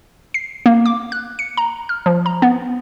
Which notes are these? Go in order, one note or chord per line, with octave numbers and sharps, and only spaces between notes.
C7
A#3
D6
F#6
C#7
A#5
F6
F3
A#5
B3